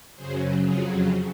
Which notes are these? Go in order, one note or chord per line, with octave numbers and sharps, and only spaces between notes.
F#2 C#3 F#3 G#4 C5
F2 C#3 F#3 F4 G#4